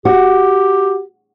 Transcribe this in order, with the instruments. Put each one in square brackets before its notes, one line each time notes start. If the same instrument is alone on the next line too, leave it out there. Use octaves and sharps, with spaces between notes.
[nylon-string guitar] F#4 [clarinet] G4